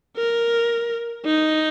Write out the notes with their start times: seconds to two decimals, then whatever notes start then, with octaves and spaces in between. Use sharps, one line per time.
0.17 A#4
1.25 D#4